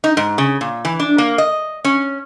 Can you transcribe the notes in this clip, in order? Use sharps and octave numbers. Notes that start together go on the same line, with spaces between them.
D#4
G#2
C#3
A#2
E3
D4
A#3
D#5
C#4